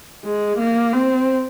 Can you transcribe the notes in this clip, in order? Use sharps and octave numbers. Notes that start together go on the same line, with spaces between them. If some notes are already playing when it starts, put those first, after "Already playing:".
G#3
A#3
C4